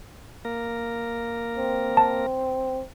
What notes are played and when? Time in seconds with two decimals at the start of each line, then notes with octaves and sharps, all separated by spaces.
0.45 A#3 A#4
1.56 C4
1.97 A5